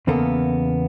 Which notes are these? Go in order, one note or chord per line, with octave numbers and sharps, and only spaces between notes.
E2 C#3 A#3 B3 A4 A#4